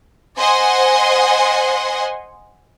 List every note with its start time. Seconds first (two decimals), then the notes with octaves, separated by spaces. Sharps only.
0.38 C5 D#5 F#5 G#5 C6